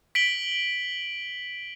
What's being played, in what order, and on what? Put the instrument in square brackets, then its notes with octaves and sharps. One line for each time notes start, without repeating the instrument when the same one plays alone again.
[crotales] B6 D7 F#7 G7